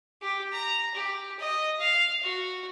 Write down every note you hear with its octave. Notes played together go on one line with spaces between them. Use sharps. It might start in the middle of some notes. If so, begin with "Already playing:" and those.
G4
A#5
G4
D#5
F5
F#4